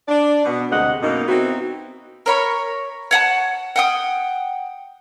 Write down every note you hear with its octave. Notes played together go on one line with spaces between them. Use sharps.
D4 D5
B2 B3
D2 C3 G#3 G4 D#5 F#5
F#2 B2 A#3 D#4
B3 C4 D#4 E4 F#4
A#4 C#5 B5
C#5 F#5 G#5 A5
F#5 G5 D#6